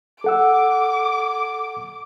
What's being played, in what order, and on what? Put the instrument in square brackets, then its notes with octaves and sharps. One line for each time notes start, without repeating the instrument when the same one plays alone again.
[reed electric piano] A4 F#5 E6 [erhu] D6